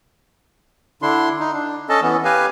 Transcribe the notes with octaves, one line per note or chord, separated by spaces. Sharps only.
D3 D4 E4 C6
D#4
D4
C#4 A4 D#5 A5
E3 B3 C#4
G4 B4 F5 G#5